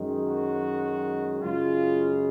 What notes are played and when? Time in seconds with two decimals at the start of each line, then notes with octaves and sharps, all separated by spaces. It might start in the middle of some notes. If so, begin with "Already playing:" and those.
Already playing: F#2 D#3 G#3
0.26 F#4
1.43 F#2 C#3 G#3 F4